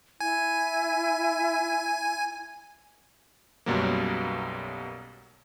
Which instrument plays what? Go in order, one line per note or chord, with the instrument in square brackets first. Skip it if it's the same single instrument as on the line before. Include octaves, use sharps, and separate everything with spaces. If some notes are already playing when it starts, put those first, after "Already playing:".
[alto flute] E4 [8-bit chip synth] G#5
[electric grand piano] B1 F#2 B2 F#3 G3 A#3